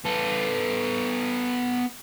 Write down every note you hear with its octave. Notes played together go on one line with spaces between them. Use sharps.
B3 A4